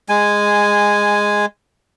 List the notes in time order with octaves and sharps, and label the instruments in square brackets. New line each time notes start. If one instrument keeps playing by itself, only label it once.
[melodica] G#3 G#5